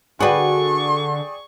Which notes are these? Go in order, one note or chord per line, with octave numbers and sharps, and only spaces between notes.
D3 F#4 G#4 B4 D5 G5 C#6